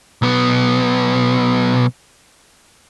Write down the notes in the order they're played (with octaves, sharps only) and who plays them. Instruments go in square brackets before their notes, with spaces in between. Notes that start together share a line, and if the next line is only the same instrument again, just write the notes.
[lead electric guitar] B1 B3